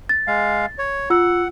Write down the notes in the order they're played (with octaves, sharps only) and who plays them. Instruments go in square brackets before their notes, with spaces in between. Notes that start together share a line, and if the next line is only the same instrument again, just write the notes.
[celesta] A6
[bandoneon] G#3 F5
C#5
[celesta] F4 E6 [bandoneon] F#5